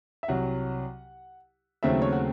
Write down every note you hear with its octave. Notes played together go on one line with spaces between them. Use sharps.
E5
C2 C3 F#3 F#5
D#2 C#3 F#3 A3 C4 E5
C#5
F#4